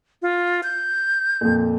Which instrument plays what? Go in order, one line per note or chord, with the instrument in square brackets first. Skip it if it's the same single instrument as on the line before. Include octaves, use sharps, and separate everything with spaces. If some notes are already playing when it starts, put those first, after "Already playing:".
[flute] F4
G6
[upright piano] F2 A#2